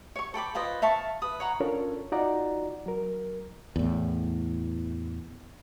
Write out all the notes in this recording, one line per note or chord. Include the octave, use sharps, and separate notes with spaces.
C#5 C#6
A4 G5 B5 D6
F4 B4 C5 D#5
E5 F5 A5 C#6
B4 D#6
C#5 F#5 A#5
C#4 D4 F4 A4 A#4 C#5
D#4 F4 F#4 D5 F#5 A#5
F#3 A#4
E2 A2